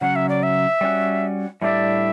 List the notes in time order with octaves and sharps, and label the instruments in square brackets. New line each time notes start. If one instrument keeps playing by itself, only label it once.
[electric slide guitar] C#3 F#3 C#4 [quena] F#5
[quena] E5
D5
E5
[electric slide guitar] G3 C#4 F#4
[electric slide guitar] A2 G3 D4 G4 D5 [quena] E5